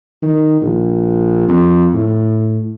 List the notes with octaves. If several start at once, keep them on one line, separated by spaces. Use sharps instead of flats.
D#3
A#1
F2
A2